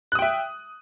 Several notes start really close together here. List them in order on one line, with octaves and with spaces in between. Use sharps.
F#6 D#6 G5 E5